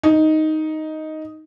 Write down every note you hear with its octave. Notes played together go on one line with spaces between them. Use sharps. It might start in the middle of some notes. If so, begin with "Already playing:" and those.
D#4